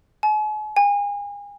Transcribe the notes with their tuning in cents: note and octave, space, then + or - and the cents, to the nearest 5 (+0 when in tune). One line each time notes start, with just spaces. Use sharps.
G#5 +45
G#5 -35